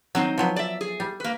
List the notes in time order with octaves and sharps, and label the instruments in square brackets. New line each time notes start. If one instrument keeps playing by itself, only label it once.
[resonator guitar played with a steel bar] D#3 C4 D#4 [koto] F#3
[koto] F3 F#3 B3
[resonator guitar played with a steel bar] D5 E5
G#4
[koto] G3
[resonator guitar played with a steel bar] A#3 B4